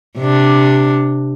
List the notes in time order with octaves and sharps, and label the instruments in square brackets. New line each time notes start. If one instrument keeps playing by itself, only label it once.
[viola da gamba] C3 D4